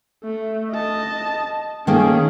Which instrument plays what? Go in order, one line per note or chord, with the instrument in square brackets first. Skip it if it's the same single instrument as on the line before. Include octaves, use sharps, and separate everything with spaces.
[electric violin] A3
D#5 A5
[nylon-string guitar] D#3 A3 A#3 [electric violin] C#4 G#4